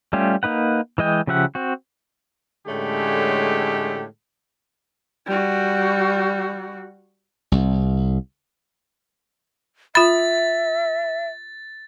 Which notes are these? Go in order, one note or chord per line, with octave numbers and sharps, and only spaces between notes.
G3 A3 C#4 F4 G4
A#3 D#4 B4 F#5
E3 G#3 D#5 G5
C#3 F3 G4 E5 F#5
C4 F#4
A2 D3 G#3 A3 C#4 G4
G3 F#4
C2
F4 E5 B5 A6